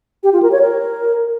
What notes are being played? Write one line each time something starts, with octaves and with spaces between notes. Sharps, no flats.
G4
F4
A#4
C#5
A#4